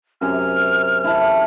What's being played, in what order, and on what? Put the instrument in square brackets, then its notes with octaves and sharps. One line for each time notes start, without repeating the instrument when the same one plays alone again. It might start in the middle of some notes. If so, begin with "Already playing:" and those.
[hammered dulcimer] F#2 C3 G#5 [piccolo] F6
[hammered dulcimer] E4 A5